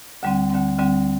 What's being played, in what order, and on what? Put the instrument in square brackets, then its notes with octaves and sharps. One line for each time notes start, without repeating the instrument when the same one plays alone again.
[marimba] D2 D3 G3 C4
D2 D3 G3 C4
D2 D3 G3 C4